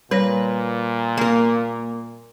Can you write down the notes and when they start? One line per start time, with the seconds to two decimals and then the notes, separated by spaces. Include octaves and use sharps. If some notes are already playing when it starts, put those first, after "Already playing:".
0.11 A#2 G3 B4 C#5 A#6
1.17 A#3 A#4